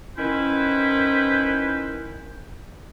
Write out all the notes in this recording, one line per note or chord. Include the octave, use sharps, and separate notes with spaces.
D#3 C#4 E4 B4 C5